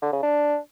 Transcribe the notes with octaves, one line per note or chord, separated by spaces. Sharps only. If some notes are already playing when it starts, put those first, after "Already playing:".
D3
C#3
D4